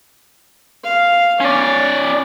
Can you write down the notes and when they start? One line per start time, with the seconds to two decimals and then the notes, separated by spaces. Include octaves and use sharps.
0.84 F5
1.40 C#4 C#5 D5